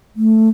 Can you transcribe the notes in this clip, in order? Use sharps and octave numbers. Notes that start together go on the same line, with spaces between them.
A3